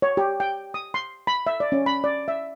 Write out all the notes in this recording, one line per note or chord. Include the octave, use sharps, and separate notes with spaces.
C#5
G4
G5
D#6
C6
B5
E5
D5
C#4
B5
D5
E5